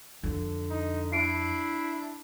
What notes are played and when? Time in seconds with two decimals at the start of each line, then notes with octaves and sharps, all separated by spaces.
0.23 F2 D3
0.70 D#4
1.12 D4 E4 C7 D7